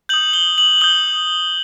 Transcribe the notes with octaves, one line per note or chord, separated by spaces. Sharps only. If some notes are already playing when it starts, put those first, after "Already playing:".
D#6 G6 F#7
G7
F#7
D#6 G6 G7